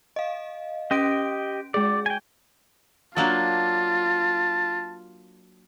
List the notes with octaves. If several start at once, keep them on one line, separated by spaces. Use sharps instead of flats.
D#5 F5
C#4 G4 D#5 D7
G#3 G#4 D5
G5 G#5
F#3 A#3 D4 F4 A5